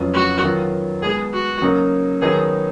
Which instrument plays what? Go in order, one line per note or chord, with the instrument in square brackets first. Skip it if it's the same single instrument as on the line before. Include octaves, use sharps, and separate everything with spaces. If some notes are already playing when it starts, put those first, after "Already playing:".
Already playing: [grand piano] F2 C#3 F#3 B3 F4
[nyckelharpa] F#4
[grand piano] D#3 F#3 B3 F4
[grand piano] B2 G#3 B3 [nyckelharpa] G#4
[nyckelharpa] F#4
[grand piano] C#3 F#3 A#3 D#4
[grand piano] D#3 F#3 B3 D#4 [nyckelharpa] G#4